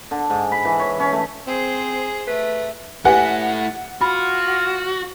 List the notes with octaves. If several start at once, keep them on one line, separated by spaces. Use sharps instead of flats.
D3
G#2
B5
E3
C#5
C#4
A3
C4 G#4 C5
A3 B4
A3 E4 G4 B4 F#5 G#5
F4 F#4 B5